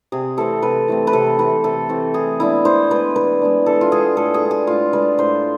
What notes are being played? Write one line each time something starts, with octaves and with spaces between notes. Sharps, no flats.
C3 G#4
E3 A3 C4 A4
C3 B4
E3 A3 C4
B4
C3 A4
E3 A3 C4 B4
C3 A4
E3 A3 C4
E3 G#4
G#3 B3 D4 E4
E3 C5
G#3 B3 D4 B4
E3 B4
G#3 B3 D4
E3 A4
F4
G#3 B3 D4 G#4
A2 A4
G#4
G#3 D4
G#4
A2 F4
G#3 D4 B4
A2 C5